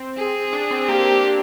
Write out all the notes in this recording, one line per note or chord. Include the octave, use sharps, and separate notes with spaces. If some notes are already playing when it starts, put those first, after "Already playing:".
Already playing: C4
G#4
D4
C4
A#3 G4